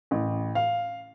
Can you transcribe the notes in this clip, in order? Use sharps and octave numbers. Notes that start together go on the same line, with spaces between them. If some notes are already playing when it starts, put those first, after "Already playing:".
A1
F5